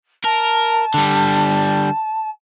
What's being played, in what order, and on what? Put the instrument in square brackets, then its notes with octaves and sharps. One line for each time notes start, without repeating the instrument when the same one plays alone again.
[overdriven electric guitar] A#4 [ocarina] A5
[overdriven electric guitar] D3 G3